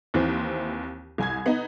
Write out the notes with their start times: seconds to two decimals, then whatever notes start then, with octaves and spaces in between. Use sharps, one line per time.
0.14 D#2 E3 C4
1.18 C2 G#5 G#6
1.46 B3 D#4